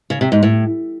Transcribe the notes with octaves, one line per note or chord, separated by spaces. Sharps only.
C#3
C3
G#2
A2